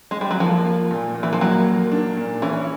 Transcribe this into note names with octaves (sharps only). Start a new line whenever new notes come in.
G#3
G3
F#3
F3 A#3
A#3
A#2
A#2
E3
F3
F#3 A#3
A#3
D4
A#2
E3 C#4